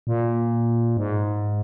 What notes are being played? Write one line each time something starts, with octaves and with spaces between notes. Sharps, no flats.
A#2
G#2